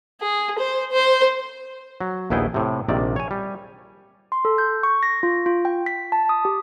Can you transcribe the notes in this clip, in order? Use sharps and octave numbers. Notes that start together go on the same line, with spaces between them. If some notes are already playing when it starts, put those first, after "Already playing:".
G#4
C5
C5
F#3
A#1 D#2 B3 E4 G#4 G5
A2 C3
A#1 C3 D#3 D5
C#5 G#5
G3
C6
A4
G6
C#6
A#6
F4
F4
G5
B6
A5
D#6
G4